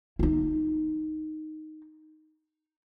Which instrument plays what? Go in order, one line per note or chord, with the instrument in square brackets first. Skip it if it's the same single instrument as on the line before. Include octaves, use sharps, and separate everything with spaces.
[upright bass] D#4 E4